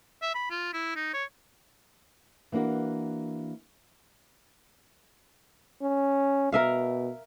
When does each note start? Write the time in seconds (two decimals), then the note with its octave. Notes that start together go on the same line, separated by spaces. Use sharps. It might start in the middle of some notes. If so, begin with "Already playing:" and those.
0.22 E5
0.35 B5
0.50 F4
0.73 E4
0.96 D#4
1.14 C#5
2.52 E3 A#3 D4 F#4 A#4
5.82 C#4
6.52 B2 A#4 E5 F5